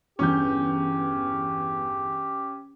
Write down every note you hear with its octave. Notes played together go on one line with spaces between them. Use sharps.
G1 E2 C#4 G4 G6